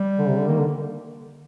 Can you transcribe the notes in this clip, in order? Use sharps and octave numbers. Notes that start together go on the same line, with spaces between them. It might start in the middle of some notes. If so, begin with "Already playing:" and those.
Already playing: G3
D3
C3
D3
D#3 A#3
D3